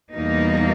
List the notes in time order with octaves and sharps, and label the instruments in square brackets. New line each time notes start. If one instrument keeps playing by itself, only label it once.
[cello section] E2 B2 G3 A#3 D#4